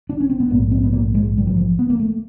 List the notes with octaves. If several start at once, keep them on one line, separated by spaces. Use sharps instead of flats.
D4
C#4
C4
B3
A#1 G#2 A#3
C4
B3
A#3
G#3
G3
F#3
F3
B3
A#3
A3